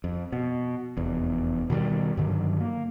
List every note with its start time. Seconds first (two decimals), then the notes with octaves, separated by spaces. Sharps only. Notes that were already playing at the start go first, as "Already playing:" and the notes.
0.04 F2
0.32 B2
0.97 F1 E2
1.70 B2 D#3 E3 G3
2.17 G2 D3 D#3 F#3
2.60 A#3